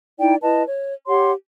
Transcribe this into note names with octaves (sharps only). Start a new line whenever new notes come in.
D#4 E4 D5 G5
E4 B4 D#5 A5
C#5
G4 C#5 F#5 C6